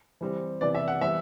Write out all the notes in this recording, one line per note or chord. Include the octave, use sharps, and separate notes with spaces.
E3 G3 C4
C3 E3 B3 D5
E5
F#5
E3 G3 B3 E5